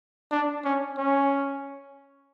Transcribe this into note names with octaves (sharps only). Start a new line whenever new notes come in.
D4
C#4
C#4